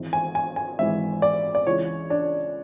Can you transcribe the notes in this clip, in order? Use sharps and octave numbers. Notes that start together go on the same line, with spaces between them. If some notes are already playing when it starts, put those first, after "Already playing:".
Already playing: G#1 G#2 E3
G#5
G#5
G#5
G#1 G#2 E3 E5
D5
D5
C#2 C#3 E3 C#5
D4